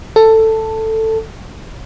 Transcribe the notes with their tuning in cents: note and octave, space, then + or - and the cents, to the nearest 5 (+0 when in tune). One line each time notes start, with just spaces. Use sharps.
A4 +10